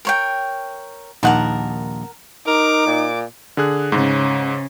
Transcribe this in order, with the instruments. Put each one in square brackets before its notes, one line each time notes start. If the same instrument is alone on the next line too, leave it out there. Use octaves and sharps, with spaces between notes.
[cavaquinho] A#4 C#5 G5
[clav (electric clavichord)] A#1 D#2 D#4 [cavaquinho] A#4 F#5 A5
[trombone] D#4 [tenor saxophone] A#4 [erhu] D6
[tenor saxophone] A#2
[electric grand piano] D3 G#4 F#6
[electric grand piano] G#2 [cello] C#3